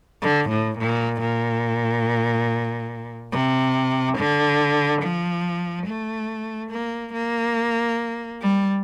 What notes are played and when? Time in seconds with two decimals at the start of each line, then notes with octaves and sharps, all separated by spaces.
0.22 D3
0.49 A2
0.78 A#2
1.21 A#2
3.32 C3
4.18 D3
5.03 F3
5.86 A3
6.71 A#3
7.13 A#3
8.42 G3